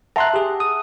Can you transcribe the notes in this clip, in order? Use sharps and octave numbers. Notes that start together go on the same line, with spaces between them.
E5 F#5 A5 A#5 C6 F#6
G4 G#4
D#6